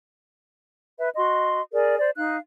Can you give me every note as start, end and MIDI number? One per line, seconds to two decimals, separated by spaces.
0.97 1.08 71
0.97 1.08 76
1.16 1.61 66
1.16 1.61 75
1.16 1.61 84
1.72 1.97 68
1.72 1.97 70
1.72 1.97 74
1.98 2.10 72
1.98 2.10 74
2.16 2.37 63
2.16 2.37 77
2.16 2.37 90